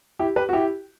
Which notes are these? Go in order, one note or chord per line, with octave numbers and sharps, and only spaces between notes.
E4 G4
G4 B4
F#4
E4 G4